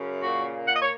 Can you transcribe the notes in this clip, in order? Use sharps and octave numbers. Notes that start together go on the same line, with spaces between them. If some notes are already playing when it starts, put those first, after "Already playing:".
Already playing: F#2 C#3
A#2 F#4
A#3
F#5
D#5
C#5